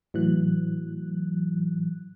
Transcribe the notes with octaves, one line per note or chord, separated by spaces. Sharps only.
A2 E3 F#3 F#6